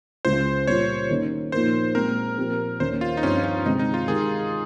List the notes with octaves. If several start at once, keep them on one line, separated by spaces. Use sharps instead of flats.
C#2 C#3 G#3 C5
A#2 G3 A#3 F4 C#5
D#3 A#3 C#4
A#2 F3 A#3 D#4 A#4 C5
A#2 G#3 C4 A#4
A#2 F3 C4 G4 A#4
D#2 D#3 A#3 C#4 C5
F4
D#4
G2 F3 C4 C#4
C#4
C3 D#3 G#3 C4 D#4
D#4
F4
D#3 G#3 D#4 G4 G#4 A#4